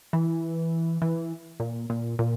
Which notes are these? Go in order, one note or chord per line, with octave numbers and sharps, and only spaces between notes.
E3
E3
A#2
A#2
A#2